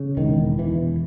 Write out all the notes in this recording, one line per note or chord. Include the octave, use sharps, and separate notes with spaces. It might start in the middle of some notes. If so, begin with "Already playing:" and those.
Already playing: C#3
E1 D#3
E2
E3
E1